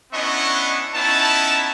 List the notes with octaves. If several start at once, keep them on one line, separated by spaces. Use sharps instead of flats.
B3 C#4 D4 E4 D#5 C#6
B3 C#4 D#4 E4 A5